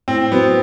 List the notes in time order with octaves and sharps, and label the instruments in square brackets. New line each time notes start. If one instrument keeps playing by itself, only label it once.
[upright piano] A2 [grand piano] C4
[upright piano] F#3 C4 [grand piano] B3